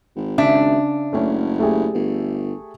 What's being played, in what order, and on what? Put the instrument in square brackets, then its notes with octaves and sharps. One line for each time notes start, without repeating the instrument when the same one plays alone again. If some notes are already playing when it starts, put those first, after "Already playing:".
[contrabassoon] G#1
[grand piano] C#3 [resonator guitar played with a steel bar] D4 E5
[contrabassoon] F#1 [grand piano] A3 C#4
[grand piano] A3 G4 G#4
[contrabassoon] G1